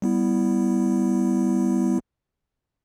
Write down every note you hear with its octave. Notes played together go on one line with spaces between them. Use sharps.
G3 B3 E4